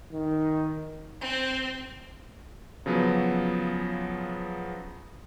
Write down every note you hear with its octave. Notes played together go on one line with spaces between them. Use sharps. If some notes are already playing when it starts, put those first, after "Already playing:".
D#3
C4
C#3 F3 F#3 B3